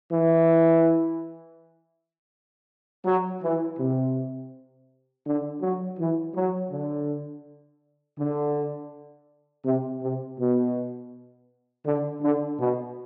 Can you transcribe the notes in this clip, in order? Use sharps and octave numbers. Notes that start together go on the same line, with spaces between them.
E3
F#3
E3
C3
D3
F#3
E3
F#3
D3
D3
C3
C3
B2
D3
D3
B2